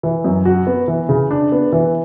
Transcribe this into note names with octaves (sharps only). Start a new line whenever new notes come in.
E3
F#2
F#4
B3
E3
C#3
D4
B3
E3